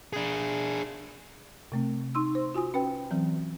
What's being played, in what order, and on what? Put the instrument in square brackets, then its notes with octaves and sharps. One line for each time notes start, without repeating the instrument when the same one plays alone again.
[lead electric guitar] D4 G#4
[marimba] C3 A3 C4
D#4 C6 E6
C5
F4 F#4 G#5 D#6
C#4 B4 G5
E3 F#3 C4